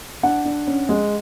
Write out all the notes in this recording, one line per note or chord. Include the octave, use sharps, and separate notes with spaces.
D4 F#5
D4
C#4
G#3